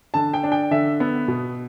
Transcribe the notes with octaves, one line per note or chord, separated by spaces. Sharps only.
D3 A5
G5
D4
G5
D3 E5
B3
B2